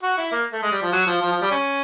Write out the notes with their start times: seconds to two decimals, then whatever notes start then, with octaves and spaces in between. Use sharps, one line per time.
0.03 F#4
0.18 E4
0.32 A#3
0.52 A3
0.62 G#3
0.72 G3
0.83 F3
0.93 F#3
1.07 F3
1.21 F3
1.32 F3
1.42 G3
1.51 C#4